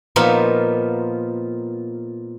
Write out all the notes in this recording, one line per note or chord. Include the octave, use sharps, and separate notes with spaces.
A#2 F3 B3 D#4 F4